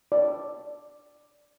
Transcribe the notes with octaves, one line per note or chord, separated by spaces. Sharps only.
D5